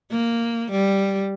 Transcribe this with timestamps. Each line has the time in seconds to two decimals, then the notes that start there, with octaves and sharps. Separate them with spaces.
0.11 A#3
0.71 G3